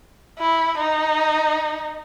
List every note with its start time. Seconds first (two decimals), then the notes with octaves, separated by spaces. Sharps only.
0.39 E4
0.78 D#4